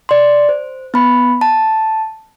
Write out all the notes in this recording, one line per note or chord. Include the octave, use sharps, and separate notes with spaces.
D5 C6
C5
B3 B5
A5